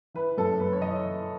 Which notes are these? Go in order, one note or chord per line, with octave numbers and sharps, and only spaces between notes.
E3 B4
F#2 A4
F#2 B4
C#5
E3 D#5
E3